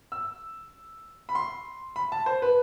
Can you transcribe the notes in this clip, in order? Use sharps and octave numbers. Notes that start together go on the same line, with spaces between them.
E6
B5
C6
B5
A5
C5
B4